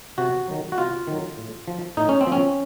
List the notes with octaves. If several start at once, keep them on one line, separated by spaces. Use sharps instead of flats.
C3 F#4
D#3 F#3
F#4
C3 F4
D#3 F#3
A2
F3
A2 D#4
C#4
C4
F3
C#4